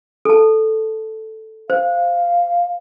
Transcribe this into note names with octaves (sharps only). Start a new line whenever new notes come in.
A4 A5
C5 F5